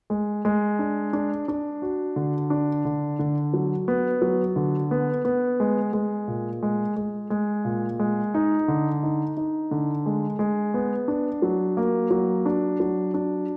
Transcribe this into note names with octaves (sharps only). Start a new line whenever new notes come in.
G#3
G#3
D4
D4
D4
F#4
D3
D4
D3
D3
F#3
B3
F#3
D3
B3
B3
G#3
G#3
A#2
G#3
G#3
G#3
A#2
G#3
D#4
D3
D#4
D#4
D3
G#3
G#3
B3
D4
F#3
A#3
F#3
D4
F#3
D4